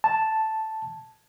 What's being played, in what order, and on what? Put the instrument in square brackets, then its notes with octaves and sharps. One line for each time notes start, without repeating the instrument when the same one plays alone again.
[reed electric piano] A5